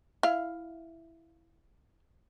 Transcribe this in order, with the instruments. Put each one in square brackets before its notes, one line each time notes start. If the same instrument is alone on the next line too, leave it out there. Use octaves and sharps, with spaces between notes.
[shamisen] E4 F5